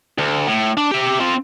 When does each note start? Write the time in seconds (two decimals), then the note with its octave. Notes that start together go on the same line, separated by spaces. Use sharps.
0.18 D2
0.48 A2
0.77 D4
0.91 G4 E5
1.20 C4 F4